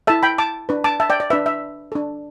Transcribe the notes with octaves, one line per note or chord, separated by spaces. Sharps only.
E4 A4 E5 A5
G5 B5
A5 D6
D4 B4
A5 D6
E5 A5
D5 G5
D5
D4 B4 E5
E5
D4 A4